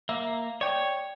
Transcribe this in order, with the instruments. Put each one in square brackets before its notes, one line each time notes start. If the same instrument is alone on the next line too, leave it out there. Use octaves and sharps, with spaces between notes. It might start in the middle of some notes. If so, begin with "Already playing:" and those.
[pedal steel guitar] A#3 [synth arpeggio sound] E5
[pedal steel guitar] C#5 [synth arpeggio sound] D5 G5